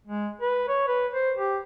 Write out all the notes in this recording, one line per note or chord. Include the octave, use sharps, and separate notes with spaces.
G#3
B4
C#5
B4
C5
G4